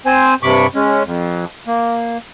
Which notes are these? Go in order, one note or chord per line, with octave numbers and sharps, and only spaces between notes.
C4 C5 G#5
G2 C3 B5 C#6 D6
G#3 C#4
F2
A#3